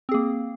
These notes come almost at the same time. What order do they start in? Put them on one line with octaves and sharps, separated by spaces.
C4 G#4 A#3